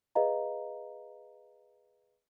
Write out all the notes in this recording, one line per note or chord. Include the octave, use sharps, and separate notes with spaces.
G#4 B4 D#5 F5 A#5